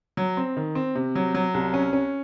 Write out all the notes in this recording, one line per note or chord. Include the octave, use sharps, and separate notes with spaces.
F#3
C4
D#3
C4
C3
F#3
F#3
C2
C#4
C#4